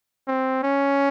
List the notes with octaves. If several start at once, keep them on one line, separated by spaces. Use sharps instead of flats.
C4
C#4